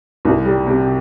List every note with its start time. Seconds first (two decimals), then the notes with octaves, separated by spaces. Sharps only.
0.25 C2
0.45 G3
0.67 C3